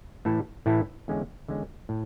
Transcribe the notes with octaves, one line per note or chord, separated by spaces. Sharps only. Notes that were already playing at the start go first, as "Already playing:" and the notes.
A2 E3 A3 E4 A4
A2 E3 A3 E4 A4
E2 D3 G#3 C#4
E2 D3 G#3 C#4
A2